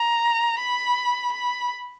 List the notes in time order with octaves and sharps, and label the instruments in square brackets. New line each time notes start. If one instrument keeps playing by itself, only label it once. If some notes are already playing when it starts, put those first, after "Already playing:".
Already playing: [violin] A#5
B5
B5